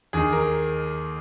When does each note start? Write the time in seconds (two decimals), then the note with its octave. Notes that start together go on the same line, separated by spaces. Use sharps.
0.13 D#2 D#3 G#4
0.33 A#4